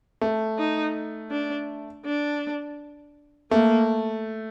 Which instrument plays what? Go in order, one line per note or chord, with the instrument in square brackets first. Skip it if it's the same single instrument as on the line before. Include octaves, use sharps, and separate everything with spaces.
[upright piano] A3
[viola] D#4
D4
D4
[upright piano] A3 [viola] A#3